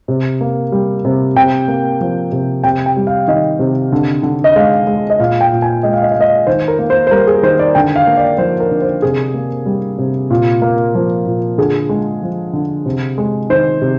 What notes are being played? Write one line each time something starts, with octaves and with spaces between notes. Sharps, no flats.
C3
A#3
G3
C3
C3 G5
A#3
F3
C3
C3 G5
G5
G3
F5
D#3 D#5
C3
D3
D3
D#5
G#3 F5
G#3
D#5
A#2 F5
G5
A#2
G#5
G#3 D#5
F5
D#5
G#3 F5
D#5
D#3 C5
A#4
A#3
C5
C5
G3 A#4
G#4
D#3 C5
D5
D3 G5
F5
A#3
D5
F3 C5
A#4
D3
C5
C3 G#4
A#3
G3
C3
A#2
A#3
F3
A#2
D3 G#4
G#3
F3
D3
C3
G#3
D#3 C5
C3